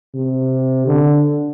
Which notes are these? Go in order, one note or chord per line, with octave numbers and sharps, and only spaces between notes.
C3
D3